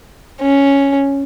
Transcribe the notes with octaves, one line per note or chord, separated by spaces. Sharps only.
C#4